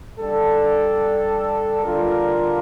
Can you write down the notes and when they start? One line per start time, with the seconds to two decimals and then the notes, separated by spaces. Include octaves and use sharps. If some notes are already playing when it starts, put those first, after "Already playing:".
0.19 G3 D4 A4
1.82 D3 G3 D4 F4 A#4